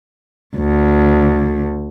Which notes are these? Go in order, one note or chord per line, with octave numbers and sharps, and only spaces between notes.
D2